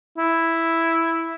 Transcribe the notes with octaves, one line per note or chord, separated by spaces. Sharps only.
E4